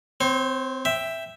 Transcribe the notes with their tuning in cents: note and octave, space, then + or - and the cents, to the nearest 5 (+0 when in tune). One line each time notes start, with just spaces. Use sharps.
C4 -20 C5 +45
E5 +0 G5 +5